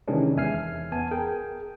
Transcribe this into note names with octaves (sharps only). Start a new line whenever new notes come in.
C3 D#3 E3 G#3 C#4 D4
E2 E5 G#5 F6 C7
B3 G#5 A5
G#4 A#4 G5